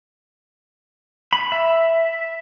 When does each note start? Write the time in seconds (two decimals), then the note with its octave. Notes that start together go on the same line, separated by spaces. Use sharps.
1.33 B5
1.52 E5